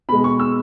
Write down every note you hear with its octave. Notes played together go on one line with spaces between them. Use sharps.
B2 G#3 B5
C#6
E6